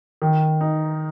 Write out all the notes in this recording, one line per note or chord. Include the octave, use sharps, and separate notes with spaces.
D#3
D#4